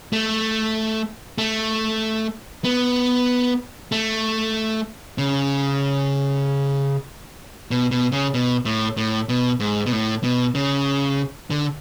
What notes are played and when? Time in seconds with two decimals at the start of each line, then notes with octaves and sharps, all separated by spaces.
0.13 A3
1.38 A3
2.64 B3
3.92 A3
5.18 C#3
7.71 B2
7.91 B2
8.12 C#3
8.34 B2
8.65 A2
8.97 A2
9.29 B2
9.60 G#2
9.86 B2
9.92 A2
10.23 B2
10.55 C#3
11.50 D3